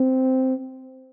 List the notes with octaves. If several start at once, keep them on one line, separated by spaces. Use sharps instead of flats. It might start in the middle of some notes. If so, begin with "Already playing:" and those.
Already playing: C4